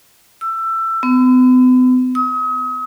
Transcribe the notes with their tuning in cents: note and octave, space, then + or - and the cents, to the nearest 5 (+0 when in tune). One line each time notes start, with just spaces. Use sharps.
E6 +20
B3 +45
D#6 +40